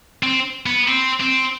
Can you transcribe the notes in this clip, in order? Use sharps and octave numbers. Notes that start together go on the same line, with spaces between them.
C4
B3
C4
C4